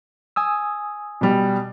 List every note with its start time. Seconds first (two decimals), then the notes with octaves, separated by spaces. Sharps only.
0.36 G#5 D#6 E6
1.21 B2 G3